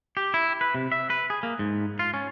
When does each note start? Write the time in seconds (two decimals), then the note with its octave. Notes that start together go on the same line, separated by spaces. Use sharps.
0.17 G4
0.34 E4
0.61 B4
0.75 C3
0.92 E5
1.10 B4
1.30 G#4
1.43 A#3
1.59 G#2
1.99 F4
2.14 C#4